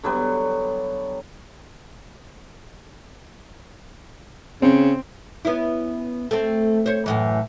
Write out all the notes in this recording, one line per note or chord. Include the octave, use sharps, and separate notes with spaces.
D3 F#3 G3 B3
C#3 C4
B3 C#4 E4
A3 C4
C5 C#5
F#2 A2 E3